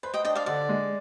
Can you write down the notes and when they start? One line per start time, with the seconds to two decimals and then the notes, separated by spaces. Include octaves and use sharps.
0.03 B4 C5
0.14 D#5 G5
0.25 D4 D#5 G5
0.35 D5 F5
0.46 D3 D5
0.69 G#3